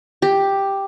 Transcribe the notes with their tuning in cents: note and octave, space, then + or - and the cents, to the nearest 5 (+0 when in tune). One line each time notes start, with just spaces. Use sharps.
G4 +5